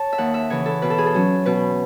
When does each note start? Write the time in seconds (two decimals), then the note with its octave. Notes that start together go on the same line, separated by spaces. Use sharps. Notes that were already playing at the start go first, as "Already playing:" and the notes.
Already playing: C#5 A5
0.13 E5
0.18 D#2 F#5
0.34 E5
0.50 C#3 E3 C#5
0.66 A4
0.82 B2 B4
0.90 A4
0.98 G#4
1.06 A4
1.14 F#3 C#4
1.46 B2 B4